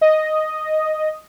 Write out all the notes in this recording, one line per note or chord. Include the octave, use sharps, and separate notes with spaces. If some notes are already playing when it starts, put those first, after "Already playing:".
D#5